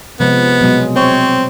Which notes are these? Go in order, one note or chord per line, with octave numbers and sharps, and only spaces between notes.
C3 F3 G#3 B3
B2 F#3 G#3
C4 C5 C#5